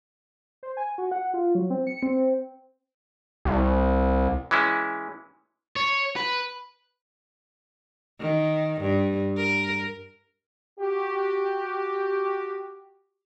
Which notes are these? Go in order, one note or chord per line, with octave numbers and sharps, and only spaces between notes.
C5
G#5
F#4
F#5
F4
F#3
C4
C#7
C4
C4
C2
E3 G#3 C#4 E4
C#5
B4
D#3
G2
A#4
F#4 G4